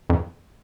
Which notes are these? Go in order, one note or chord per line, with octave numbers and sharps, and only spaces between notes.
F2